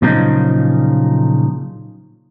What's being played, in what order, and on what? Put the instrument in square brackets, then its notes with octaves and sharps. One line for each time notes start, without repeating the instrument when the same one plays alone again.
[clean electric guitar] A#2 C#3 F3 F#3 D#4